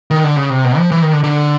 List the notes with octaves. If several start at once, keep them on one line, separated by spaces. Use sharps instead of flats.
D#3
D3
C#3
C3
B2
F3
E3
D#3
D3
D3